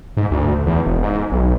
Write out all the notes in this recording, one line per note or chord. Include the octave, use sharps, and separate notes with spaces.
G#2
D2
E2
E1
G#2
B1